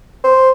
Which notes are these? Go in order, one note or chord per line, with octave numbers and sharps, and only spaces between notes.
C5